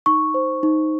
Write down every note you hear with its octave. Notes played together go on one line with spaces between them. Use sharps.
D#4 C#6
C5
D#4